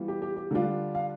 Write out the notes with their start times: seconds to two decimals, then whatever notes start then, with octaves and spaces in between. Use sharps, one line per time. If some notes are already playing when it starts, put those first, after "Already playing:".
Already playing: E3 G3 B3 F4
0.08 G4
0.22 G4
0.36 G4
0.51 D3 G3 D4 F4
0.95 F5